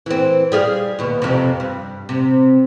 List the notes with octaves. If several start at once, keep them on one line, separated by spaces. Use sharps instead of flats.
E3 C4
G3 G#4 F5
D#2 B2
F2 C3
G2
C3